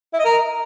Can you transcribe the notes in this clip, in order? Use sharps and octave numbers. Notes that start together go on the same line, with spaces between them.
E4
D#5
A#4